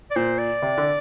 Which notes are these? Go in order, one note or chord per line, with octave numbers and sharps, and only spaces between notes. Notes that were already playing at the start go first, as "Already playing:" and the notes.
D5
A#2 C5
D5
C3
D3